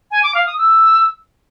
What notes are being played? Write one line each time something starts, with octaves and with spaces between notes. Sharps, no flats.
G#5
D6
F5
D#6
E6